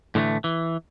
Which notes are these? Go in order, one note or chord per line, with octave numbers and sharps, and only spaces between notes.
A2 D3 E3 G#3 A3
E3